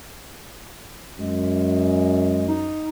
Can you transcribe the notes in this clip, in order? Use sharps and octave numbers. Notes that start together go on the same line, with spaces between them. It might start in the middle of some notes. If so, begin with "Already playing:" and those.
F#2 G#3
D#4